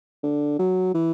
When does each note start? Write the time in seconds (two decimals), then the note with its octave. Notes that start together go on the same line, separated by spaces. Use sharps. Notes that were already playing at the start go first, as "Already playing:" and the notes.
0.23 D3
0.59 F#3
0.94 E3